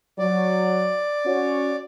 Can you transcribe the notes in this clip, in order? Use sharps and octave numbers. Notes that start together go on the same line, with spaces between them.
F#3 D5
C#4 F#4 C#5